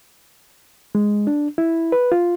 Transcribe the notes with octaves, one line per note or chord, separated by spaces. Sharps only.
G#3
D4
E4
B4
F4